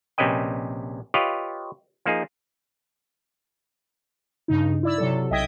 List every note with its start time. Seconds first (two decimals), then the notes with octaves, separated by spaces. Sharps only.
0.18 A#1 C3 C#4 B4 D#5 G5
1.14 F4 G4 B4 C#5 D#5 F5
2.05 F3 A#3 D#4 G#4
4.48 G2 C#3 D#4
4.83 E4 D5 E6
4.98 C3 F#3 A4
5.31 B1 D#5 E5 G5 D#6 G#6